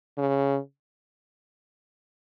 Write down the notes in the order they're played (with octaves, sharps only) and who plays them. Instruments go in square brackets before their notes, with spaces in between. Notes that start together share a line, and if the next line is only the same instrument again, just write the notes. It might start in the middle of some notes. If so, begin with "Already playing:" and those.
[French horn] C#3